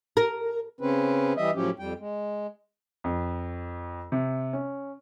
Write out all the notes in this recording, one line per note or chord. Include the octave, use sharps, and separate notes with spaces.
A#4
C#3 C4 C#4 B4
E3 G3 D#5 E5
A2 F3 F#3 C#4 G4
F2 G3 G5
G#3
F2
C3
C#4